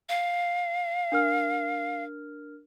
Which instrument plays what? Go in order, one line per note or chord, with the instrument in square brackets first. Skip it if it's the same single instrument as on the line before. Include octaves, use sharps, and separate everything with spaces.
[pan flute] F5
[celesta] D4 A#4 F6